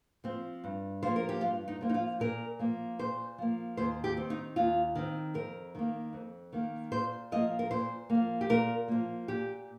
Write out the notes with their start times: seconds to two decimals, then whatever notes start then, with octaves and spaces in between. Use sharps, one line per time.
0.24 F3 C4
0.64 G2
1.03 F3 A#3 C5
1.16 A#4
1.29 G4
1.41 G2 F4
1.68 D#4
1.81 F3 A#3
1.89 D#4
1.94 F4
2.20 A#2 A#4
2.59 F3 A#3
2.99 A#2 C5
3.38 F3 A#3
3.77 D#2 C5
4.04 G4
4.17 D#3 C4
4.30 D#4
4.56 D#2 F4
4.95 D#3 C4
5.34 F2 A#4
5.75 D#3 A#3
6.13 F2
6.53 D#3 A#3
6.92 A#2 C5
7.32 F3 A#3 D#5
7.59 A#4
7.70 A#2 C5
8.10 A#3
8.15 F3
8.41 G4
8.49 A#2 A#4
8.88 F3 A#3
9.28 A#2 G4